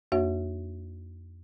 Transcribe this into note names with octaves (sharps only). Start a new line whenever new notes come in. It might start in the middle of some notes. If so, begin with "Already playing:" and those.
F2 A#3 D4 F#4 C#5 E5